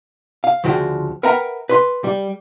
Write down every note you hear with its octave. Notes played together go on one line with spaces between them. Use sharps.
F5
D2 C#3 F3 F#4 G5
A#4 B4 E5 F#5 G5 A#5
B4 C6
G3